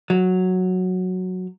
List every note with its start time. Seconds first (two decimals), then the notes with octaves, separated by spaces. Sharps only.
0.10 F#3